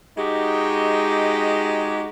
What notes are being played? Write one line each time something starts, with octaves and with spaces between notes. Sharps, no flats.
G#3 D#4 F#4 G4